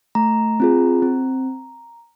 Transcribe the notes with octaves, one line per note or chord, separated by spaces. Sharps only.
A3 A#5
C4 F4 G#4
C4